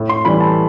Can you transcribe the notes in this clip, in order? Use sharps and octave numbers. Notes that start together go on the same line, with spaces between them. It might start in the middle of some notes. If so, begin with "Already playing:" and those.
Already playing: A2
C6
E3 G3 B5
A5